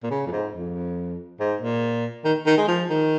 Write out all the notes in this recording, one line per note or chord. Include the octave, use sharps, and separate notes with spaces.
A#2
C#3
F2
G#2
F2
G#2
A#2
D#3
D#3
G#3
F3
D#3